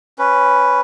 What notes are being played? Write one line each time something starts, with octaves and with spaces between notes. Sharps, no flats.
C#4 B4